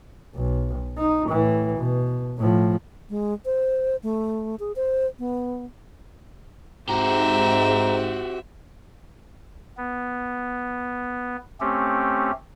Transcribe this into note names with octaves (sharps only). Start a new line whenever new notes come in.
B1
D#4
A2 E3
B2
A2 F3
G#3
C5
A3
G#4
C5
B3
G#2 C4 F#4 G4 E5 A#5
B3
A3 C4 C#4 G4